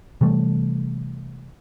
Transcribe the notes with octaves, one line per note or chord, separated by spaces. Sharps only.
C3 E3 G3 A3